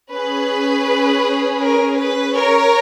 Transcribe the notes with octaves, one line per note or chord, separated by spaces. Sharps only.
C#4 G#4 B4
A#4
B4
A#4 C#5